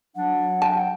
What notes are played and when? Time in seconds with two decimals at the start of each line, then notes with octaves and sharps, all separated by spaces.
0.16 F#3 D4 F#5
0.62 G5 A5